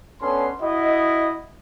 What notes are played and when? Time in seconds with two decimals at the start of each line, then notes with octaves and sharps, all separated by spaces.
0.21 B3 C#4 D4 A4 C6
0.61 E4 F#4 D#5